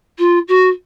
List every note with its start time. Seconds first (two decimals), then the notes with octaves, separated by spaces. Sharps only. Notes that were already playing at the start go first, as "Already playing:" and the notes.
0.18 F4
0.48 F#4